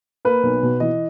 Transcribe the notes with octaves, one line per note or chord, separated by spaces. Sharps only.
A#3 B4
B1
B2
E3 D#5